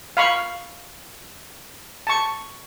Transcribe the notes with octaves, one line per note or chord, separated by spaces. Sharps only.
F5 B5 C#6
A5 C#6